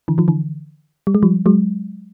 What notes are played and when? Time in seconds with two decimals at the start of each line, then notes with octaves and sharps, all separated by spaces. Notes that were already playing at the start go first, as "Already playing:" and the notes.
0.08 D3 E3
0.18 D#3 F3
0.28 D3 E3
1.07 G3
1.15 G#3
1.23 F3 G3
1.46 F#3 G#3